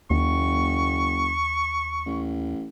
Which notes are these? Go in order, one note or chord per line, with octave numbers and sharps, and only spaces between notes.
F#1 D#2 C#6
A1